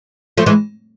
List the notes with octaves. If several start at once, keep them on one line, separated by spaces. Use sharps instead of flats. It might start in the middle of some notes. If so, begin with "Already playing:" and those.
F3 A3
E3 G#3